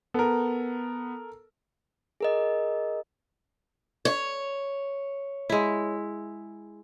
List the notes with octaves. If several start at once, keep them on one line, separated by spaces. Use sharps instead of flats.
B3 A4 A#4
G#4 A#4 D#5
C#5
G#3 E4